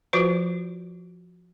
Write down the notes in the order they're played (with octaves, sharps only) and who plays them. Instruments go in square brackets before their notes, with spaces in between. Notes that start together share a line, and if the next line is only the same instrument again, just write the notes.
[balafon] F3 F4 F#4 B4 C5